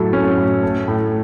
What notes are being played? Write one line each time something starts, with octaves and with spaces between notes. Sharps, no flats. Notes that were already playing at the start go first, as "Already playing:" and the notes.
Already playing: A2 F#3 E4 A4
C#4
A2
A3
A2